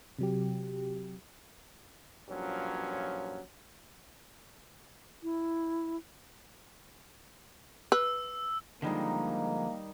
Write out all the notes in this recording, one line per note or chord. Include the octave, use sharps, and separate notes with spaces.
C3 F#3 G4
G2 A#2 F3 F#3 C#4
E4
B4 E6
D3 D#3 F3 G3 G#3 A#3 D#4